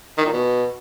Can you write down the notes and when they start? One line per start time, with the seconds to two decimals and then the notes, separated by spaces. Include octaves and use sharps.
0.18 D#3
0.25 A#2
0.33 B2